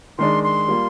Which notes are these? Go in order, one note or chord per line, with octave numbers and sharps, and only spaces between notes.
D#3 G#3 D4 C6
C6
G3 A#3 F4